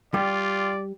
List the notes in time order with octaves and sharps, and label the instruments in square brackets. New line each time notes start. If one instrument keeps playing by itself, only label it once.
[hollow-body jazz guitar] G3 [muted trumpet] F4 [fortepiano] G4 [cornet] D5